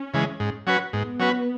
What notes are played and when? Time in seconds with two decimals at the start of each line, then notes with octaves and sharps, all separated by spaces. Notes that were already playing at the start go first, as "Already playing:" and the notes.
Already playing: C#4
0.14 C#3 E3 G#3
0.40 G#2
0.67 F#3 C#4 F#4 B4
0.93 G#2 B3
1.19 F#3 C#4 F#4 B4